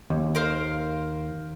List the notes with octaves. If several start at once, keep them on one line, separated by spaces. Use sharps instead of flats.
D#2
A#4 C5 F5